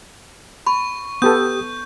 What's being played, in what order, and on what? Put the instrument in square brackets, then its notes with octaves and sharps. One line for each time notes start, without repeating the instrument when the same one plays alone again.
[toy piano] B5 [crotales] C#6
[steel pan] B3 A4 [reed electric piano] G4 D#6 [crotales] G6